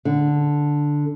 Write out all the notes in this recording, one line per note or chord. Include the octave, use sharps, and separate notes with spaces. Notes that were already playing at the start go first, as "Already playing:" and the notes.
D3